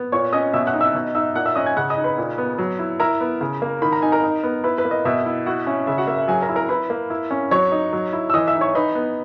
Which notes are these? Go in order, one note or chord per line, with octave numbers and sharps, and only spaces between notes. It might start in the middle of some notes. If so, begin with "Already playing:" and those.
Already playing: B3
A#2 C#5 C#6
C#4 D#5 D#6
B2 E5 E6
F#5 F#6
D#4
E5 E6
B2
D#4 E5 E6
A#2 F#5 F#6
E5 E6
C#4 D#5 D#6
G#5 G#6
C#3 F#5 F#6
D#5 D#6
D#4
B4 B5
A#2
B3
F#3
E4
E4 A#4 A#5
B3
C#3
A#3
D#3 B5
A#5
D#4 G#5
A#4 A#5
D#4
B3
E4 B4 B5
B4 B5
A#3
D#5
B2 E5
E4
E4 F#4 F#5
C#4 E5
C#3 E5
F#4 F#5
A#3 E5
E5
F#3 G#4 G#5
A#4 A#5
E4
A#4 A#5
E4 B4 B5
A#3
E4
C#4
F#3 C#5 C#6
D#4
F#3
E4
E6
E3 D#5 D#6
E5 E6
D#4
C#5 C#6
D#4 B4 B5
B3